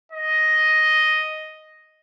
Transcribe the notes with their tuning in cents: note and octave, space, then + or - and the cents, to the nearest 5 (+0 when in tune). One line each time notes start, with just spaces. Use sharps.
D#5 +5